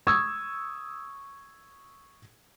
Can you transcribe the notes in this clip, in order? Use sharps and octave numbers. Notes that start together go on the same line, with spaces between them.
C#6 D#6 E6 G#6